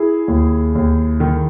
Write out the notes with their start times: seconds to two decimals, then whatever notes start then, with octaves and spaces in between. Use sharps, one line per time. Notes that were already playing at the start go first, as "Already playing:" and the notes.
Already playing: E4 G#4
0.28 D#2
0.75 D#2
1.20 D#3